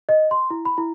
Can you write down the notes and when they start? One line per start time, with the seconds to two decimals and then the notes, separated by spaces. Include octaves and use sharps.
0.09 D#5
0.31 C6
0.50 E4
0.65 B5
0.78 E4